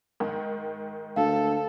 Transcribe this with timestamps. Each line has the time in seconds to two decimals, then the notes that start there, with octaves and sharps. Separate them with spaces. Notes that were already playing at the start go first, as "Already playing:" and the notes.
0.20 G#2 D#3
1.16 D2 A4 F5